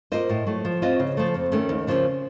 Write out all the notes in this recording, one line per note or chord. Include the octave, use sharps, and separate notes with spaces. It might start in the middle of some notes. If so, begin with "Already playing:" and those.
A#3 F4 C5 D#5
A2
F#3 A3
F3
C4 F4 C5 D#5
C#3
F3 A3
F2
D#3 A3 C#4
D#2
C#3 F3 A#3 C#4